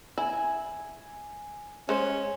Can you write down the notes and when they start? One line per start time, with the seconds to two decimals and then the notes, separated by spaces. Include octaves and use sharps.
0.18 E4 G#5
1.89 G#3 C#4 C5